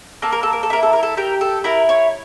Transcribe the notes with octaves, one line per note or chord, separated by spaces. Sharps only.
A#3 A4
A#4
A4
A#4
A4
E4 A#4
A4
A#4
A4
G4 A#4
A4
E4 A#4
C#5